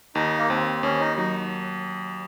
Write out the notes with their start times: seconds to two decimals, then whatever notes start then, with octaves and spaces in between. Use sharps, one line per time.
0.15 D#2 D#4
0.38 A#3
0.49 D#2 C4
0.83 D#2 C#4
1.00 D#4
1.17 F#3 D#4